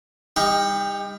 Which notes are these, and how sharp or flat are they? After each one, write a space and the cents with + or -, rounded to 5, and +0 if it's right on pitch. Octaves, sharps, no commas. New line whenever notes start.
G3 +35 D#4 +0 G5 +0